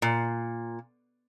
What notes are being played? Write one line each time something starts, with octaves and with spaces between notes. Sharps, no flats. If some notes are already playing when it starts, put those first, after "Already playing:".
A#2